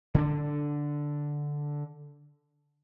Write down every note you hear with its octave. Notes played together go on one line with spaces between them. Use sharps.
D3 C4 D4